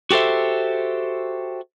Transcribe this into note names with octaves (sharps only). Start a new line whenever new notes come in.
F#4 G4 A4 C5 E5